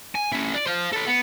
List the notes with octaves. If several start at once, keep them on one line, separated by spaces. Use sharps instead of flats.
G#5
C#4 E4
D5
C5 F5
A4 B4
B3